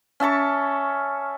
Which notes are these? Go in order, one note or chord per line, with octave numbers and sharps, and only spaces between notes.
C#4 E5 A5 C#6